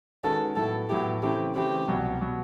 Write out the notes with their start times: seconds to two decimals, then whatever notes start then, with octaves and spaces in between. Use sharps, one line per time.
0.24 D#3 G#3 C#4 F#4 A4 B4
0.56 A2 F#3 B3 E4 A4
0.89 A2 F#3 B3 E4 G4
1.22 C#3 E3 A3 C4 E4 G4
1.55 C#3 E3 A3 C4 E4 G4
1.88 C2 B2 F#3
2.21 B2 F#3